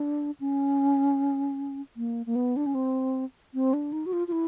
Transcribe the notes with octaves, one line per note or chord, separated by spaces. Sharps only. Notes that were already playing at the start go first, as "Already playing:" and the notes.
Already playing: D4
C#4
A#3
A#3
B3
D4
C#4
C4
C4
D4
D#4
F#4
F4
F4
E4